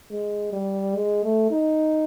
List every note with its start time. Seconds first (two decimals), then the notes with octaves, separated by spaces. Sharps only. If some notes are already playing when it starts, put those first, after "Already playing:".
0.11 G#3
0.53 G3
0.95 G#3
1.23 A3
1.51 D#4